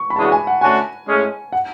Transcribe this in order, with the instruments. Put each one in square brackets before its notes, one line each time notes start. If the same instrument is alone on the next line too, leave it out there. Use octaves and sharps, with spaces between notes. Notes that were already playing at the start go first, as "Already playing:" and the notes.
Already playing: [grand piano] C#6
B5
[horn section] C#3 E3 G#3 D4 F#4 [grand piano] A5
[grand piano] G#5
F#5
[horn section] D3 A3 C#4 F#4 [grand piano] G#5
[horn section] A2 G#3 C#4
[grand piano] F#5